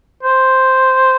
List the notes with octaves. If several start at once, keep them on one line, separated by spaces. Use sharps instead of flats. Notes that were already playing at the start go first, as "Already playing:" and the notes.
C5